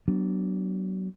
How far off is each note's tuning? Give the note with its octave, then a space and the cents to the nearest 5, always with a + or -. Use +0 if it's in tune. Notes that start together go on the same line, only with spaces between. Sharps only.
F#3 +30 B3 +0 D4 +0